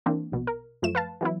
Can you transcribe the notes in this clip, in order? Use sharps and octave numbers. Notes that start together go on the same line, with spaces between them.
E3 A#3 C4 D4
A#1 B2
A#4
F#2 F3 A3 E7
B4 F5 A5
E3 F#3 B3 E4